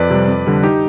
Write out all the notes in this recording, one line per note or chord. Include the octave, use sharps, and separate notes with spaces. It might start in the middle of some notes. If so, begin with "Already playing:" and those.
Already playing: F2 B4 D5
C3 G3
F2
D3 G3
D#4 G4